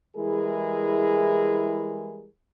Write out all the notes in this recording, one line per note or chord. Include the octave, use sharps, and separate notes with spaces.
E3 G3 G#3 E4 G#4 A#4